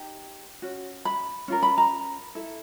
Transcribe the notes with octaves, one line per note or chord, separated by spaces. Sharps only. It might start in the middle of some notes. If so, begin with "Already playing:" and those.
Already playing: D#4 G4
C#4 F#4
B5
C#4 F4 A#4
B5
A#5
E4 A4